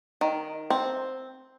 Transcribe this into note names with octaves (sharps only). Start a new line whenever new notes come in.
D#3
C4